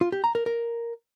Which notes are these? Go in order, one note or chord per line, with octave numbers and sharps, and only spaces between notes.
F4
G4
A#5
A#4
A#4